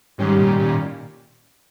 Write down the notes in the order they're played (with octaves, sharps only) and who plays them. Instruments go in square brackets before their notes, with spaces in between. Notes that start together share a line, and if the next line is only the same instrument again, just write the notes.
[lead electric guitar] G#2 [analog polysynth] D#3 G3 C#4 G4
[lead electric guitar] A#2
A#2